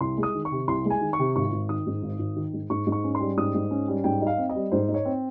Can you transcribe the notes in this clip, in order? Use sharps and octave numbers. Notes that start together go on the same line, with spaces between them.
C2 C6
G#3
D#6
D#3
C#6
C3
C2 C6
G#3
G#5
D#3
C#6
C3
G#1 C#6
G#1
D#3 D#6
G#2
G#1
G#1
D#3
G#2
G#2 C#6
G#2
C#6
C#4
C6
G3
G#2 D#6
G#2
C#4
G3
G#2 G5
D#4 F5
C4
D#5
G3
G#2 C5
D#4
C#5
C4